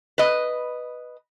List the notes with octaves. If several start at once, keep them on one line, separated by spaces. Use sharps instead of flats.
B4 D#5